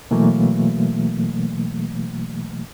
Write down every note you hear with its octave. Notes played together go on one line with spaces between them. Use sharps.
B2 E3 F#3 A3 A#3